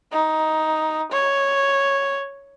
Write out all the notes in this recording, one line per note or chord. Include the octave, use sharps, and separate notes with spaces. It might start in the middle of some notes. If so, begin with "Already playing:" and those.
D#4
C#5